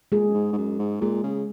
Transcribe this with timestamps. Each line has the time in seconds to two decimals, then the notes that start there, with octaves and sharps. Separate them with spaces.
0.12 A#2 G#3 G#4
0.28 F#2
0.34 G#2
0.53 G#2
0.58 F#2
0.79 G#2
1.01 A#2 G#3 G#4
1.23 C#3